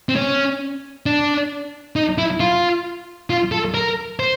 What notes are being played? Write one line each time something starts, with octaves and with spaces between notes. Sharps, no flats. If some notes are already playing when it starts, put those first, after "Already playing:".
C4
C#4
D4
D#4
E4
F4
F4
A4
A#4
C5